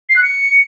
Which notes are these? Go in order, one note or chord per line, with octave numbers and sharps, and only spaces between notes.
C7
F#6
C#7